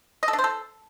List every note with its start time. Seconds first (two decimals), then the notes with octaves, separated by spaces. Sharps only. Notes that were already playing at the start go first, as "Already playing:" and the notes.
0.23 D#5
0.28 A4
0.33 D4
0.39 C5
0.44 A4